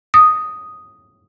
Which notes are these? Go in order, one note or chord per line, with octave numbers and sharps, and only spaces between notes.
D#6